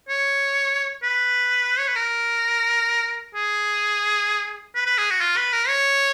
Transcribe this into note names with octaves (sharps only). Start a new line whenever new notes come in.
C#5
B4
C#5
B4
A#4
G#4
B4
B4
G#4
F#4
F4
B4
A#4
C#5